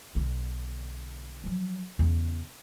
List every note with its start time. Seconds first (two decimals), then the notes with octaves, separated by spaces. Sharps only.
0.15 B1 D3
1.44 F3 F#3
1.99 E2 C#3